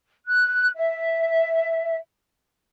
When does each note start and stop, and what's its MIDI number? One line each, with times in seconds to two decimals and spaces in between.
0.26 0.68 90
0.75 1.95 76